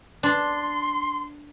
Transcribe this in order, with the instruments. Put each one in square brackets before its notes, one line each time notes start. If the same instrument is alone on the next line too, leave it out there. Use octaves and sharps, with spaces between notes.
[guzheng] D4 [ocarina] C6